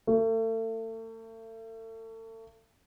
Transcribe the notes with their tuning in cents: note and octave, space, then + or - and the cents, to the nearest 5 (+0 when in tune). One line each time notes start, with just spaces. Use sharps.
A3 +35